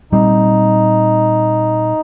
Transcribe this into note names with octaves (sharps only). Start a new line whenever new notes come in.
A#2 G3 C4 D#4